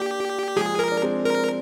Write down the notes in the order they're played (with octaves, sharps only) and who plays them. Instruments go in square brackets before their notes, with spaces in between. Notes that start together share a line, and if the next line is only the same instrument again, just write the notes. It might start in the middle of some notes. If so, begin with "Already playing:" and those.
Already playing: [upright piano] A#3 D4 [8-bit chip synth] G4
[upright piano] F3 G#3 [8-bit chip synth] G#4
[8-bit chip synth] A#4
[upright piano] D4
G#3 C4
[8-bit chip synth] A#4